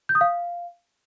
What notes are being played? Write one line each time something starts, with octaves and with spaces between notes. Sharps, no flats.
G6
D#6
F5